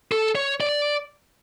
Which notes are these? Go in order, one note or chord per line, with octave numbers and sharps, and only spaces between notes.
A4
C#5
D5